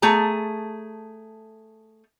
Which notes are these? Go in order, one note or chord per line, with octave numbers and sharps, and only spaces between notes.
A3 G#4 A5 A#5